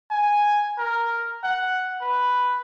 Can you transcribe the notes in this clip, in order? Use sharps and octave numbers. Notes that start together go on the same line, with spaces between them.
G#5
A#4
F#5
B4